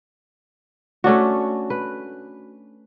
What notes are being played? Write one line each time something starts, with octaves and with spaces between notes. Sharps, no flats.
A3 C#4 D4 F#4
B4